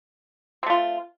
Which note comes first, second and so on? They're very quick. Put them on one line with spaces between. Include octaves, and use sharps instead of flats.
C4 A3 F4